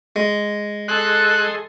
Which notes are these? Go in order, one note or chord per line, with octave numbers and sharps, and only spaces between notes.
G#3
G#4 A4 D#5 C6 F#6